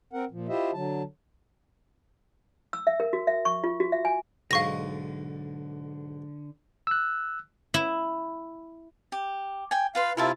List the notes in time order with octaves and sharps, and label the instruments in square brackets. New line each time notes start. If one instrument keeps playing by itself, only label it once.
[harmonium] C4 A#4 F#5
A#2 F3
E4 F4 G4 C5 D#5 E5
D3 F#3 A5
[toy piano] E6
E5
A#4
F#4
E5
C#6
F4
F#4
E5
G#5
[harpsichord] B1 G#2 D#5 [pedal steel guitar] D3 [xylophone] F5 C#6 A#6
[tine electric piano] E6 F#6
[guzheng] E4
[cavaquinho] G4
G5 G#5
[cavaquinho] F4 B4 C6 [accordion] F5
[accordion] C3 E4 F4 [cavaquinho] A#4 E5 A5